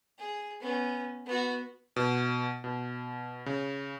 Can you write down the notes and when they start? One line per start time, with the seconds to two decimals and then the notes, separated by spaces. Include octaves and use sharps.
0.19 G#4
0.60 B3 C#4
1.26 B3 F#4
1.96 B2
2.64 B2
3.46 C#3